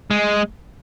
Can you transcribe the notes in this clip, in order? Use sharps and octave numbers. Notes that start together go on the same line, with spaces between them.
G#3